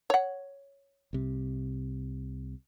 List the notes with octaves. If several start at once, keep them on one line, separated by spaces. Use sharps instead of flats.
C#5 F#5
C2 C3